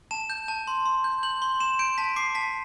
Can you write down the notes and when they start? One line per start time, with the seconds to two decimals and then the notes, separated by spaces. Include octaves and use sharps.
0.11 A5 E7
0.30 G6
0.48 A5
0.67 C6
0.86 C6
1.04 G6
1.23 G6 F#7
1.42 C6 G7
1.60 C6 E7
1.79 G6 D7
1.98 A5 B6
2.16 D6 C7
2.35 A5 B6